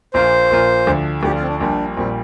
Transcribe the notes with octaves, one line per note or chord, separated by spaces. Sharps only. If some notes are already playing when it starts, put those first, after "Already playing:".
A#1 A#2 A#3 F4 C5
A#1 A#2 A#3 F4
D2 D3 F3
D2 D3 F3 G4
F4
C4
D4
A#1 A#2 G3 D4
A#1 A#2 G3 C4